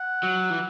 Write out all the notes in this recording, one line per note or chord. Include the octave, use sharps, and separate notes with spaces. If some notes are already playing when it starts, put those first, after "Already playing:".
Already playing: F#5
F#3
E3